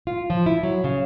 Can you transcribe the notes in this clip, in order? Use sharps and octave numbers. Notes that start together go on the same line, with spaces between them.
F4
F3
E4
F#3
C#3